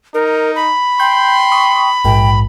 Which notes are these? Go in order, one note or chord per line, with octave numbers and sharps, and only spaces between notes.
D#4 A#4
B5
G5 C6 G6
C#6 D#6
A#1 G#2 G5